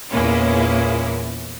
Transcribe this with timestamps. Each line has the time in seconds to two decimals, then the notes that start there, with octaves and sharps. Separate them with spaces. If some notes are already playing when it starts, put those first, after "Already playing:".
0.12 E2 A#2 G#3 A#3 C#4 E4